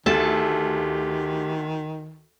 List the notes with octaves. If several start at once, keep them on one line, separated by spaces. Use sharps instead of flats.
D2 D#3 G4 A4 A5